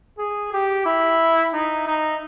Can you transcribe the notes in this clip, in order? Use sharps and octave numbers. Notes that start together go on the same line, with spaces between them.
G#4
G4
E4
D#4
D#4